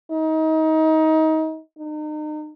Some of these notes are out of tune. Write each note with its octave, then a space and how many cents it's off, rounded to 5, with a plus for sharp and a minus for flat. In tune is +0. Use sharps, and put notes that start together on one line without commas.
D#4 +25
D#4 -35